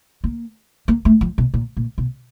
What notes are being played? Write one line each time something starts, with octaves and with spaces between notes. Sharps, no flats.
A#3
A#3
A3
F3
B2
A#2
A#2
B2